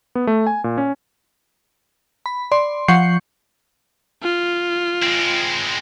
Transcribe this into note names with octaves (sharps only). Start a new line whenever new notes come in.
B3
A3
G#5
A#2
C#4
B5
D5 C6
F3 F#5 C#6 G6 C7 C#7
F4
G#3 C4